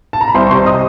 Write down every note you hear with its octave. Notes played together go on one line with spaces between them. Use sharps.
A5
A#5
B5
C2 C5 C6
C#6
C3 C5 C6
D#5 D#6